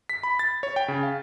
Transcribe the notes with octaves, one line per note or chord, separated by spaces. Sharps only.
B6
B5
A6
C#5
G5
C#3
F5